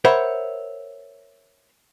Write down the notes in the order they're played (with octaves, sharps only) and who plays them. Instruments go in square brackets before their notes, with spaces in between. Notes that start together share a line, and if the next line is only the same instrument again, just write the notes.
[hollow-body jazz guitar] A#4 C5 C#5 E5 F#5 B5